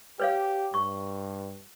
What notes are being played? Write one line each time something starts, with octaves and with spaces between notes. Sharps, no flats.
G4 B4 C#5 F5
G2 C#6